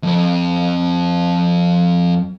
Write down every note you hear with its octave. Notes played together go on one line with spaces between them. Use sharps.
F2 C4